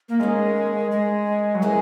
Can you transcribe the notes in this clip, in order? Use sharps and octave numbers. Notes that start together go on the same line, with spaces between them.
A#3
D#2 D#3 G#3 A#3 C#4
G#3
F#3
E3 G#3 A#3 C#4 G#4